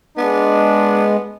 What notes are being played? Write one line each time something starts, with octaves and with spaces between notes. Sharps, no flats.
G#3 B3 D4